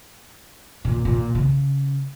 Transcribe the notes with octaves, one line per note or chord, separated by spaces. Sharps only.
A#2
A#2
C#3